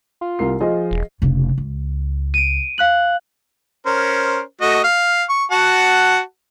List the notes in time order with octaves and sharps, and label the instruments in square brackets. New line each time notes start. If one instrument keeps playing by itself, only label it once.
[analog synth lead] F4
[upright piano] C2 A#4 C7
[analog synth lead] F3 [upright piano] F4 G#4 D#5
[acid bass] E1
[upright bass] F1 C#3
C#2
[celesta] D7 D#7
F5 F#6 F#7
[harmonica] C#4 A#4 C5
A3 F#4 D#5
F5
C#6
F#4 F#5 A5